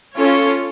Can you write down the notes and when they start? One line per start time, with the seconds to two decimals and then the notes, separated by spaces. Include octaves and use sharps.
0.17 C#4 F4 A4 C#5